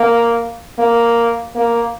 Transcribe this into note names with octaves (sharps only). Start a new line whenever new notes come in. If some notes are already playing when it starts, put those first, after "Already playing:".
Already playing: A#3
A#3
A#3